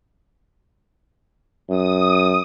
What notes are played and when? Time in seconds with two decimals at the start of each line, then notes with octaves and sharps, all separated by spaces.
1.70 F#2 D#6